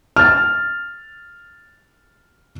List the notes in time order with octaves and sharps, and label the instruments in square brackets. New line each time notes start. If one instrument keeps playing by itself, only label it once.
[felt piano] F6 A6